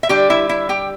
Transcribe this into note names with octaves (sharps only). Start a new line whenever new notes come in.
E5
D3 G3 D4 G4 G5
E4 E5
E4 E5
G4 G5